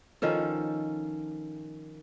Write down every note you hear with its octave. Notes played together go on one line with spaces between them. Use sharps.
D#3 F3 C#4 A4